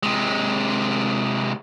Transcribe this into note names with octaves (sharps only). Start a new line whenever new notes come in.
C3 G#3